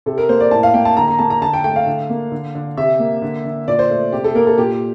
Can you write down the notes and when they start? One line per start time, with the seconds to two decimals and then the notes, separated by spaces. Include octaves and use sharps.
0.06 C3 A4
0.18 A#4
0.29 A#3 C5
0.40 D5
0.51 A2 A5
0.63 F5
0.74 A#3 G5
0.85 A5
0.97 D3 A#5
1.08 A#5
1.19 A#3 A5
1.30 A#5
1.42 D3 A5
1.53 G5
1.64 A3 G5
1.76 F5
1.87 D3
2.10 A#3
2.32 D3
2.55 D3
2.77 C3 E5
3.00 A#3
3.22 D3
3.45 D3
3.68 A#2 D5
3.79 C5
3.90 A3
4.12 C3 G4
4.24 A4
4.35 A#3 A#4
4.47 A4
4.58 A#2 G4